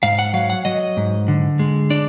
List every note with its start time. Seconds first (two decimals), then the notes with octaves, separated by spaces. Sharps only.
0.03 G#2 F5
0.19 F#5
0.34 F#3 F5
0.50 F#5
0.65 F#3 D#5
0.97 G#2
1.28 D3
1.59 G#3
1.90 D4 D5